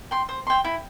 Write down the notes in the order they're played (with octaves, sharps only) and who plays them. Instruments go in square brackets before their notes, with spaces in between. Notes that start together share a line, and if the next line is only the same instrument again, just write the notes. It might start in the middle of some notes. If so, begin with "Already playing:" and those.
[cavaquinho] G5 C6
C5
G5 C6
E4